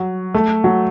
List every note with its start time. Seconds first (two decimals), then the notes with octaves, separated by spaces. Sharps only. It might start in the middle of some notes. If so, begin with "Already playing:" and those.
Already playing: F#3
0.34 A3
0.64 F#3